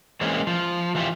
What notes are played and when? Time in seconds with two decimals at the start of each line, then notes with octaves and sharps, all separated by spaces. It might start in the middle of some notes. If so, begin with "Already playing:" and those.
0.21 E3 G#3 A#3 C4 C#4 E4
0.47 F3
0.95 E3 F4 G4 E5